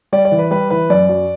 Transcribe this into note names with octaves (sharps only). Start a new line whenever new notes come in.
G3 D5
D5
E3
B4
G3 B4
E3 B4
F#2 D5
F#3